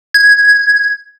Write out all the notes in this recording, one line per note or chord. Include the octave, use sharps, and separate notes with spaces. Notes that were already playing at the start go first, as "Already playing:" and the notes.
G#6